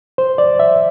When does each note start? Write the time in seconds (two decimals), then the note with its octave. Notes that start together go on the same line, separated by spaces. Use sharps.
0.18 C5
0.38 D5
0.59 E5